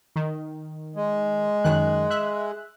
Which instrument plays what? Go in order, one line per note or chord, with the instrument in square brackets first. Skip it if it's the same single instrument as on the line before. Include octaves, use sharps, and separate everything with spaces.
[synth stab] D#3
[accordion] G#3
[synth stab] F#2 D#3 F#6
E5 F#6